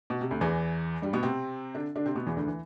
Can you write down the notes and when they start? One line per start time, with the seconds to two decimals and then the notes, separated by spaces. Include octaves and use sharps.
0.10 B2
0.21 C3
0.31 D2 D3
0.41 E2 E3
1.02 G2 G3
1.13 B2 B3
1.23 C3 C4
1.75 D3 D4
1.95 D3 D4
2.06 C3 C4
2.15 B2 B3
2.26 E2 E3
2.37 D2 D3
2.47 E3